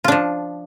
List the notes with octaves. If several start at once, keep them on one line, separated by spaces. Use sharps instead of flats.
F3 D4 F4